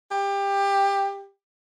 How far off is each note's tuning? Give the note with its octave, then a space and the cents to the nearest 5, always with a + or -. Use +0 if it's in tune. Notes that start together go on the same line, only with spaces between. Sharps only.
G4 +20